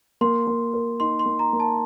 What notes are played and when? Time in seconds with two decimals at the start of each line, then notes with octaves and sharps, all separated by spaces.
0.21 A#3 C6
0.47 A#3
0.74 A#4
1.00 D#4 C6
1.19 C6
1.26 A#3
1.39 A#5
1.53 A#3
1.60 A5